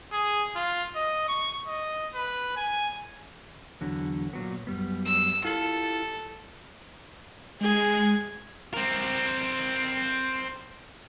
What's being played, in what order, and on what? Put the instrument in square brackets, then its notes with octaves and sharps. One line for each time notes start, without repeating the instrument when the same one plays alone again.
[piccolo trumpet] G#4
F4
D#5
C#6
D#5
B4
G#5
[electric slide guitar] E2 D3 F#3
A#2 F#3 B3
F#2 G3 B3
[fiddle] E6
[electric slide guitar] E4 F4 G4 [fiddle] A4
[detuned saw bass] G#3 [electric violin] G#4 G#5
[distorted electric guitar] C4 A#4